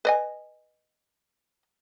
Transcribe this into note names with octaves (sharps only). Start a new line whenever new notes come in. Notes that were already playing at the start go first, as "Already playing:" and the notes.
B4 D#5 G#5